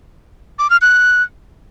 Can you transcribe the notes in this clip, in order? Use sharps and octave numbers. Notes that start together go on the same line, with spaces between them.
D6
F6
F#6